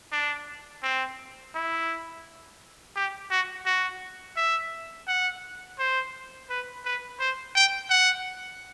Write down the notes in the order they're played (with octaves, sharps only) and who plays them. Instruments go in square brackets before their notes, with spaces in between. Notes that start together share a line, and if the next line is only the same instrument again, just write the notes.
[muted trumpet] D4
C4
E4
G4
F#4
F#4
E5
F#5
C5
B4
B4
C5
G5
F#5